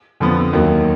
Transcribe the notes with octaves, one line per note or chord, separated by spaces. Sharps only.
F2 D3 F3 B3
D#2 D#3 F#3